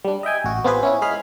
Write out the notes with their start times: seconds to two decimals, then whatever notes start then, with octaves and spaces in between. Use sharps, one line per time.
0.05 G3 D4
0.23 D#5 E5 G5 G#5
0.44 A1 F#4
0.64 B3 C4 F4 G4 G#4 B4
0.83 C#4 E4
1.02 G#3 G#4 F5 B5 F6